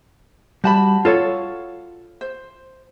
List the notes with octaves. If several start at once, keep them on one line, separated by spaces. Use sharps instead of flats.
G3 F#4 A5 B5
F4 A4 C#5
C5